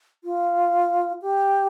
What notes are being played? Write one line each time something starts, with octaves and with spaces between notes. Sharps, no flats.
F4
G4